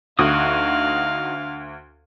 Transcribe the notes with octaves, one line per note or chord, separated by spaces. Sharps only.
D2 D#4 F#4 F5 D#6